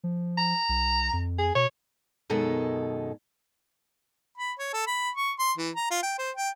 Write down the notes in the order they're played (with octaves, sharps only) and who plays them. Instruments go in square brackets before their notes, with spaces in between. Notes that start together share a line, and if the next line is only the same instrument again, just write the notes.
[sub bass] F3
[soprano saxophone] A#5
[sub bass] B1
F2
[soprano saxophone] G#4
[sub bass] B2 [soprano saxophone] C#5
[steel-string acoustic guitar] F#2 B2 D#3 G#3 A4
[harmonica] B5
C#5
A4
B5
C#6
C6
E3
A#5
F4
G5
C5
G5